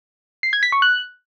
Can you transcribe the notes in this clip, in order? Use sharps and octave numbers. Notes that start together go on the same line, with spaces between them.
C7
G#6
B6
C#6
F#6